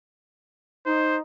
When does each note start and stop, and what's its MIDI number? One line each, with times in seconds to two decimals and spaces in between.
0.86 1.20 63
0.86 1.17 72